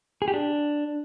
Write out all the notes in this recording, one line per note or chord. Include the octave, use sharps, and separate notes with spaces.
G#4
G4
D4